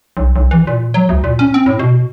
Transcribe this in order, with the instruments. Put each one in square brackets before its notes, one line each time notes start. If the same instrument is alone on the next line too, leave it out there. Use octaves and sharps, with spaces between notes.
[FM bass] B1
B1
E3
A#2
F#3
D2
A#2
C#4
C4
A2
B2